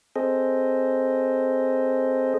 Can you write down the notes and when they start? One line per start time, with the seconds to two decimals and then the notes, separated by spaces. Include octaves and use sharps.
0.16 C4 G#4 A4 C5 D#5